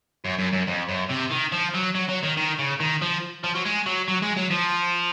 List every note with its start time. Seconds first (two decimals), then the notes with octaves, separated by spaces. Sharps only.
0.25 F#2
0.39 F#2
0.52 F#2
0.67 F2
0.89 F#2
1.10 C3
1.31 D#3
1.52 F3
1.74 F#3
1.95 F#3
2.09 F#3
2.23 D#3
2.37 D#3
2.59 C#3
2.80 D#3
3.02 F3
3.44 F3
3.55 F#3
3.66 G#3
3.86 F#3
4.08 F#3
4.22 G#3
4.37 F#3
4.50 F3